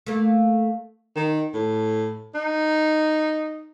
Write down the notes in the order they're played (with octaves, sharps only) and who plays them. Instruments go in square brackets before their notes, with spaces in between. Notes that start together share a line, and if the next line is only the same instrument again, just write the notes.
[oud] A3 A#3
[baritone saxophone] D#3
A2
D#4